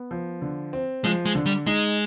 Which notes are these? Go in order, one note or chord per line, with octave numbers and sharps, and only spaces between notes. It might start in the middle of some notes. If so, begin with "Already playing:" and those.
Already playing: B3
F3
D3
C4
F3 G#3
G#3
D3
G3
G#3 D#4